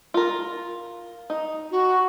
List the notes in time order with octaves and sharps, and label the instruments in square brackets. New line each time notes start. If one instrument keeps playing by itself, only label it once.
[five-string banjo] F4 A#4
D#4
[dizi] F#4